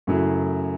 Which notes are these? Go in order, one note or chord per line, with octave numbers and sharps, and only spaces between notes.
F#2 C#3 F#3 A3 E4